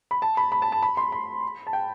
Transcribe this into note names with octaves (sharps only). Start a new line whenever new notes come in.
B5
A5
B5
B5
A5
A5
B5
C6
B5
A5
G5